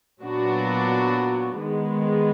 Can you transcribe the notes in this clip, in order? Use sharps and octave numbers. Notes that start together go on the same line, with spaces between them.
A#2 F#3 B3 D4 F#4
D#3 G#3 B3